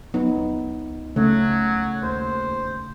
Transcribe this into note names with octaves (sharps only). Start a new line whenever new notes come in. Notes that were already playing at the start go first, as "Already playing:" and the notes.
F#3 B3 D#4
C#2
C#3 F#3 A3
D#2 C5